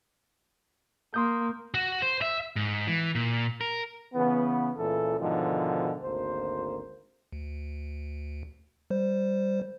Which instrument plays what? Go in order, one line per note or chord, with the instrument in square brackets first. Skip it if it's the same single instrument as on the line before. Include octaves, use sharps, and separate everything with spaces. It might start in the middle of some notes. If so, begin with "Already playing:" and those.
[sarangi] A#3 [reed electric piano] C6 D#6 G6
[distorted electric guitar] F#4
C5
E5
[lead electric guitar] G#2
E3
A#2
A#4
[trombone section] C#3 E3 B3
C#2 A#2 C#3 E3 A4
G#2 B2 D3 D#3 F3
G#1 D2 A#3 C5
[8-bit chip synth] D2
G3 C5